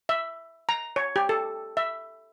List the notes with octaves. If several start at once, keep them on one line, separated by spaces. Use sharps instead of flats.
E5
A#5
C#5
G4
A4
E5